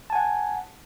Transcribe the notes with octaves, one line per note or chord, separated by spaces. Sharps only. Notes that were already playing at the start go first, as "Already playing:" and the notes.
F#5 G#5 A5